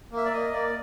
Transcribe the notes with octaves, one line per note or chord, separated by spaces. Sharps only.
A#3
E5
D5
A#3 D#5
A#3 D5